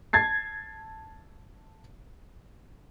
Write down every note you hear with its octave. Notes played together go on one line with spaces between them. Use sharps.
A5 G#6 A6 C7